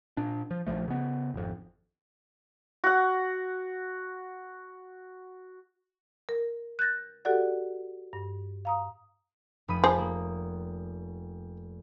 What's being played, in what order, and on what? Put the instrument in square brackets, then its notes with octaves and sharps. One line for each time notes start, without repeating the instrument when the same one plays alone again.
[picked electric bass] A#2 D4
F3
A#1 E2 F3 A3
C#3 B3
G#1 F2
[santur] F#4 F#5
[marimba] A#4
F#6 G6 A6 A#6
F#4 G4 A4 D5 F#5
G2
F5 A#5 D#6
[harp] F1 B5 D#6
[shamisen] F3 G#4 C5
[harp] A#3